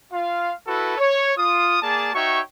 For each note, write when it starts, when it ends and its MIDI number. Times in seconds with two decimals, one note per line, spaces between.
0.12 0.52 65
0.12 0.52 77
0.67 0.97 64
0.67 0.97 66
0.67 0.97 69
0.67 0.97 71
0.98 1.31 73
1.37 1.78 65
1.37 1.78 87
1.81 2.10 58
1.81 2.10 68
1.81 2.10 74
1.81 2.10 81
2.14 2.40 63
2.14 2.40 66
2.14 2.40 73
2.14 2.40 76
2.14 2.40 79
2.14 2.40 85